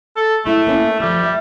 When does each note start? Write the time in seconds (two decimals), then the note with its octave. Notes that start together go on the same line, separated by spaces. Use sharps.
0.16 A4
0.45 G#3 A3 E4
0.67 A#3 C#4 E4
1.00 F3 G3 A3
1.23 E5